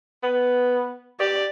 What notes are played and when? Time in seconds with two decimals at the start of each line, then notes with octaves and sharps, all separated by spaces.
0.23 B3
1.20 G4 D5